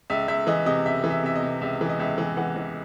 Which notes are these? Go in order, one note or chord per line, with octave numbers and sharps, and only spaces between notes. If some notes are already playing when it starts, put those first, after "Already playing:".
C#2 E5
C#2 E5
E3 D#5
C3 D#5
C#2 E5
E3
E5
C3 E5
D#5
C3
C#2 E5
E3
D#5
C#2 E5
E3
E3 F#5
E3